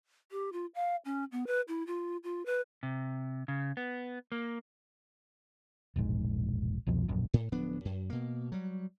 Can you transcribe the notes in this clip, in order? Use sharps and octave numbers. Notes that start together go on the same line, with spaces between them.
G4
F4
F5
C#4
B3
B4
E4
F4
F4
B4
C3
C#3
B3
A#3
E1 A#1 G#2
C2 F2 B2 F3
E1 A#1 F#2
A2
D1 F3 B3 D4
F#2
B2 A#3
F#3 G3